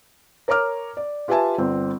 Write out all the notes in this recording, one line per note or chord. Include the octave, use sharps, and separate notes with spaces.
A#4 C#5 A#5 D6 F6
D5
F4 G4 B4 E5 G#5 A5
G1 C4